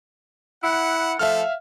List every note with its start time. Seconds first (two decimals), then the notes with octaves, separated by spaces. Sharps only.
0.64 E4 F#5
1.19 F3 A3 A4 E5 F5 F6